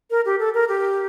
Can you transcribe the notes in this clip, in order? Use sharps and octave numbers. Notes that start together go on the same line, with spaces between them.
A#4
G4
A4
A#4
G4